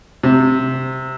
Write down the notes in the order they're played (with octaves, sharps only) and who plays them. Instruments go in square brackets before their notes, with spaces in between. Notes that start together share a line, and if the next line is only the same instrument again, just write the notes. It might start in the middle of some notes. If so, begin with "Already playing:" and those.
[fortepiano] C3